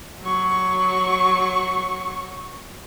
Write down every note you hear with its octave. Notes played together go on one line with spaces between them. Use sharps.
F#3 C#6